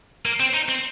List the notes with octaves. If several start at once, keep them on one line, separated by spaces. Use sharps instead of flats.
A#3
C4
D#4
C4